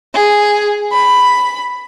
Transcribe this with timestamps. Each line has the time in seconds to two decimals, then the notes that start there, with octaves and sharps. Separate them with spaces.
0.14 G#4
0.92 B5